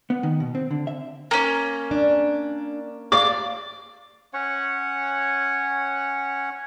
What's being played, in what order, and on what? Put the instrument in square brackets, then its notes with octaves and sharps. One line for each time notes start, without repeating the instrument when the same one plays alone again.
[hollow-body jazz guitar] B3
D#3
B2
C4
D3
E5
[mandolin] A#3 C#4
[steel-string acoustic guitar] D4
[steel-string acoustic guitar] G#4 F5 [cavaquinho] D5 D6
[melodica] C#4 C#5 F#5